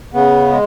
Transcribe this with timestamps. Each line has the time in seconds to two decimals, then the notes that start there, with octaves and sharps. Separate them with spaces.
0.14 C#3 B3
0.51 G#3